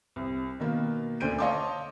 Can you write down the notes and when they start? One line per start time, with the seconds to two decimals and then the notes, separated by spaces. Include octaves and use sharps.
0.16 C2
0.60 B2 D#3 A#3
1.20 D2 D3 G6 D7 D#7
1.38 C#5 D#5 F5 A5 C6 D6